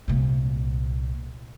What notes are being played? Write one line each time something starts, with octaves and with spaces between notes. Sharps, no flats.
C2 A#2